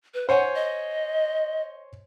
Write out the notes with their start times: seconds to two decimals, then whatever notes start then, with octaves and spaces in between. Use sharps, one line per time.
0.14 B4
0.29 C5 C#5 F#5 G#5
0.55 D#5